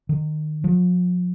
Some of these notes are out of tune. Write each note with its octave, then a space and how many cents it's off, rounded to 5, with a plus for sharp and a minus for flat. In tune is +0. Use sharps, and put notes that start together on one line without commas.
D#3 -25
F3 +45